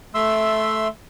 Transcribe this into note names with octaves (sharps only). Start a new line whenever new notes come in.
A3 E5 C6 E6